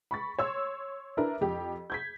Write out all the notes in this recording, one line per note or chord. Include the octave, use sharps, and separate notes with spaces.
B5 C#6 A6
C#5 C6 E6
D4 E4 A#4 B4
F2 G4
G6 G#6 B6